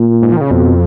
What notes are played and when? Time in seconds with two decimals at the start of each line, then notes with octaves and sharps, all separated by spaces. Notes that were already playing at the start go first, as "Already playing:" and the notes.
Already playing: A#2
0.22 G#2
0.32 F3
0.37 D#3
0.41 C#3
0.51 F2 B2